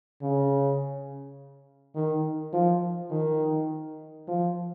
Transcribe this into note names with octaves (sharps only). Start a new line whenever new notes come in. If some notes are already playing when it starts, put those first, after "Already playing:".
C#3
D#3
F3
D#3
F3